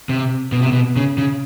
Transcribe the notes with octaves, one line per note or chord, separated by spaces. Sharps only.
C3
B2
C3
B2
C#3
C#3